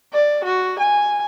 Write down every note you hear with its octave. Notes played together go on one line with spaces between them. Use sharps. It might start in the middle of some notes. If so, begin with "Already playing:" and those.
D5
F#4
G#5